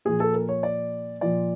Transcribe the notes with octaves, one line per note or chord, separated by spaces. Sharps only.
A#2 F3 G#4
A4
A#4
C#5
D5
A#2 F3 D5